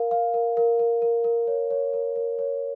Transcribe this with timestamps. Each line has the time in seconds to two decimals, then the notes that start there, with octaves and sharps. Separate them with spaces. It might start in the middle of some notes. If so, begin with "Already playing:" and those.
Already playing: A#4 F5
0.11 F5
0.34 A#4
0.57 A#4
0.79 A#4
1.02 A#4
1.24 A#4
1.47 C#5
1.71 C#5
1.93 A#4
2.16 A#4
2.39 C#5